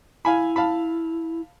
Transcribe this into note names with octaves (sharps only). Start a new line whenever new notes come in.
E4 F5 G#5 B5
F5 A5 B5